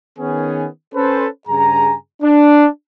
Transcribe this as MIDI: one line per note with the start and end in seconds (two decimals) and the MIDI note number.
0.19 0.67 51
0.19 0.67 59
0.19 0.67 61
0.19 0.67 68
0.94 1.27 61
0.94 1.27 69
0.94 1.27 71
0.94 1.27 72
1.48 1.95 43
1.48 1.95 49
1.48 1.95 68
1.48 1.95 80
1.48 1.95 82
2.22 2.66 62